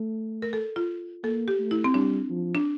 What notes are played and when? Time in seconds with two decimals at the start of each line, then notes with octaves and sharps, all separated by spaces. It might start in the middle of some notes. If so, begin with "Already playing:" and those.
Already playing: A3
0.42 A#4
0.53 A4
0.76 F4
1.24 A#3 A4
1.48 G4
1.59 A3
1.71 E4
1.84 C4
1.94 G3 D4
2.30 F3
2.55 D4